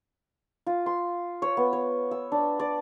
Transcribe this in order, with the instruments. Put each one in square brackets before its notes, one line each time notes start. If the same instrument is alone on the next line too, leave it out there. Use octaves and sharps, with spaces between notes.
[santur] F4
C6
C#5
B3
C#5
E6
D4
D5